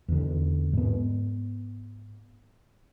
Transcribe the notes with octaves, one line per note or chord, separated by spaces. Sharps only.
E2 D3
G#2 B3